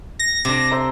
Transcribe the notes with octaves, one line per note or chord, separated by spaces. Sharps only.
A#6
C3 D4
C5 E5 A#5